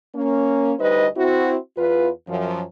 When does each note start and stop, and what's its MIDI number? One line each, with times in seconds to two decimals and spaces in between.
0.15 0.73 58
0.15 0.73 61
0.79 1.07 38
0.79 1.07 55
0.79 1.07 63
0.79 1.07 71
0.79 1.07 72
0.79 1.07 75
1.16 1.56 60
1.16 1.56 64
1.16 1.56 66
1.77 2.09 40
1.77 2.09 65
1.77 2.09 71
2.28 2.62 42
2.28 2.62 53